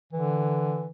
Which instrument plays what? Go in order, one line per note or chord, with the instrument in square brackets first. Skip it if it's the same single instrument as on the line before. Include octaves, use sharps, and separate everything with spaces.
[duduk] D3 [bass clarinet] E3